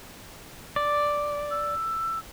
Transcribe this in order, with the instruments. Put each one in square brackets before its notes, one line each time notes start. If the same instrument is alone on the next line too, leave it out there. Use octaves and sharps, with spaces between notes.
[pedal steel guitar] D5
[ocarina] E6